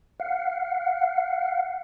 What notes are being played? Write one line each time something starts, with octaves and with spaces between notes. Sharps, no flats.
F5 F#5